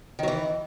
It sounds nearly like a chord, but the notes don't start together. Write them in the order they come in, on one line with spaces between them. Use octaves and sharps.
D#3 F#3 E3